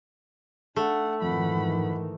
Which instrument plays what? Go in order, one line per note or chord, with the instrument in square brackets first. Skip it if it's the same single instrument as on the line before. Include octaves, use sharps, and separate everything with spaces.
[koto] A3 [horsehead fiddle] D4 F#5
[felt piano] F2 [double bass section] G#2 D#3 E3 [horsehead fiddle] F#5 B5